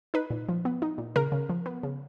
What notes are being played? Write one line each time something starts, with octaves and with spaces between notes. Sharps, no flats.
D#4 B4
A#2
F3
B3
D#4
A#2
C#3 A#4
C#3
F3
B3
C#3